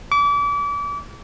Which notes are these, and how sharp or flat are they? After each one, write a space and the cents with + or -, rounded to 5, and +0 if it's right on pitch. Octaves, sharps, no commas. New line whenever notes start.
D6 -35